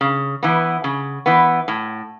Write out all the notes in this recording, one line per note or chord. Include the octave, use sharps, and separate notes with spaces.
C#3
E3 B3
C#3
E3 B3
A2